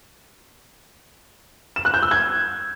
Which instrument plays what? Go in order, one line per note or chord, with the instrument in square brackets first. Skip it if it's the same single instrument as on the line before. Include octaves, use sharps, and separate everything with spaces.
[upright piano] E7
F#6
G6
E6
G#6